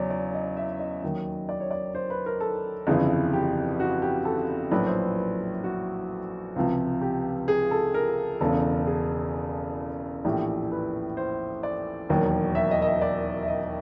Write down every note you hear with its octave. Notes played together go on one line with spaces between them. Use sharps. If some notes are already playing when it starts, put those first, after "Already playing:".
Already playing: E2 C#3 F#3 C#5 D5
D5
D#5
E5
D#5
D#2 D#3 F#3
D5
C#5
D5
C5
B4
A#4
A4
G1 F2 C#3 E3 G#4
G4
F#4
G4
A4
A#1 A2 F#3 B4
C5
B4
B4
F#4
C#2 C3 F3
G4
G#4
A4
A#4
E1 E2 C#3 A4
G#4
A#1 A2 E3 G4
B4
C5
D5
E1 D#2 D#3 F#3
E5
D#5
D#5
E5
D5
E5
D#5